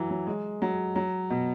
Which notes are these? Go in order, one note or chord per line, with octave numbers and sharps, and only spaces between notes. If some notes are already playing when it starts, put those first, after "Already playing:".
Already playing: E3 F#3
F#3
G#3
F#3
F#3
B2